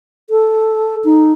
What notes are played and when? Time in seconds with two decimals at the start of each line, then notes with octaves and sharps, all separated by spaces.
0.30 A4
1.05 D#4